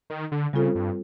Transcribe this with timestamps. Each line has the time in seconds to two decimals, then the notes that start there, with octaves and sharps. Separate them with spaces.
0.10 D#3
0.32 D3
0.53 C#3 G3 C4 F4 A4 C5
0.75 G2